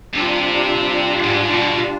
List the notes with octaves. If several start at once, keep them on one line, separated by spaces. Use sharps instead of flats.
C3 G3 D4 F4
G#2
B2